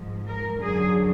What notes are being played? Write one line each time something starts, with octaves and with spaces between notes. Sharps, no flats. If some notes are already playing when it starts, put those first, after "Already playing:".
Already playing: G#2 F3 G#3
A#4
F#2 D3 F#3 G#4